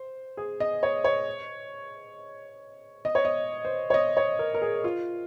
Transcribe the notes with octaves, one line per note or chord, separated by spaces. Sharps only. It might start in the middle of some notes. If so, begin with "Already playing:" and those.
Already playing: C5
G#4
D#5
C#5
C#5
D#5
C#5
D#5
C5
C#5
D#5
C#5
A#4
A#4
G#4
F4